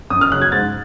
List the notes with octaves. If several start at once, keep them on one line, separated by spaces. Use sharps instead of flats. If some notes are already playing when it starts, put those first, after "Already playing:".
F#2 D#6
F6
C#3 F#3 F#6
G#6
G#2 A6